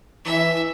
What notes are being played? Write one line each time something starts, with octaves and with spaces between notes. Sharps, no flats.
E3 E5